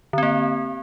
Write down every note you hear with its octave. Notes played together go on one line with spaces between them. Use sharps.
D3 A#3 C4